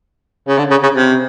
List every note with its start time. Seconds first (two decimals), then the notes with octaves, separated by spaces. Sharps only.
0.48 C#3
0.58 D3
0.71 C#3
0.83 C#3
0.96 C3